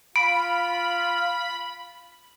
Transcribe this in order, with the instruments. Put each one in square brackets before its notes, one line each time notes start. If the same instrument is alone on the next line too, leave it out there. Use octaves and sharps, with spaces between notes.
[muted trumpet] F4 [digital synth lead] B5 [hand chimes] D7